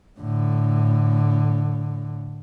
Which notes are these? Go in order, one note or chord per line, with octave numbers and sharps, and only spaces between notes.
A2 D3